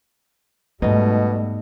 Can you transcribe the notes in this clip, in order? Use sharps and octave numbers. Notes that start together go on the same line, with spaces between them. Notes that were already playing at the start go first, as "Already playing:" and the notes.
G#2 B2 G3 A3 B3 D#4